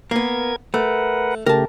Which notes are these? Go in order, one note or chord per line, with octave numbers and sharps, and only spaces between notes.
A#3 B3 A#4 G#6
A3 A#4 B4 F#5
C#3 A3 G4 A#4 A5